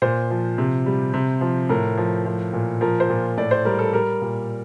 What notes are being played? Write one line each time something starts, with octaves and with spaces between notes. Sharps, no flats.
A#2 C5
F3
C3
G3
C3
F3
A2 A#4
F3
F3
A#2
F3 A#4
C5
A#2
A2 D5
C5
G3 A#4
A4
G3 A#4
A#2